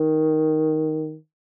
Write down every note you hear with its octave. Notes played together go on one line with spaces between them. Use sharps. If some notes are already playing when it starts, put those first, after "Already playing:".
Already playing: D#3